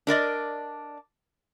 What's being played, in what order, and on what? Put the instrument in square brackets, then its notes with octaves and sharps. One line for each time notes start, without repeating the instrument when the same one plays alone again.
[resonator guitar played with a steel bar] D4 A#4 D5 D#5